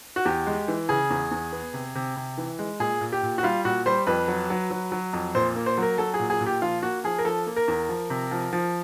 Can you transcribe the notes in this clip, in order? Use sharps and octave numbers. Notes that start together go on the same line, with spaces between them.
F#4
E2 G4
G#3
E3
C#3 G#4
E2
E2
B3
C3
C3
C3
E3
G#3
A#2 G#4
A#2
G4
A#2
F#4
G3 F4
A#2 F#4
G3 C5
F2 B4
F#3
F#3
F#3
F#3
F2
A#2 C5
A#3
C5
F#3 A#4
F#3 A4
G#4
A#2
G#4
A#2
G4
F3 F4
A#3 F#4
F3 G#4
A#4
F3 A4
A#3
A#4
E2
F3
C3
F3
F3